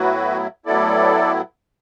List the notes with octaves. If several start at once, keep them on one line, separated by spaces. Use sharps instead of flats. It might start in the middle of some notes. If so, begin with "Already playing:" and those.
Already playing: A2 F#3 B3 E4 F#4 B4
A2 F#3 B3 E4 A4 D5